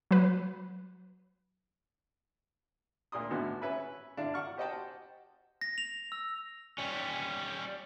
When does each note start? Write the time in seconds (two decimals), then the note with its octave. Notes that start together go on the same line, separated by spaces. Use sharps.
0.11 F#3 B4
3.12 D2 A#2 D5 C6 D#6
3.30 G#1 A2 D3 B3 F#4
3.62 C#4 B4 E5 G#5 B5
4.17 D3 D4 E4 F5
4.34 F#5 C#6 F6
4.57 G4 C5 D#5 F#5 G5 A5
5.61 A#6
5.78 F7
6.12 E6
6.78 G3 C#4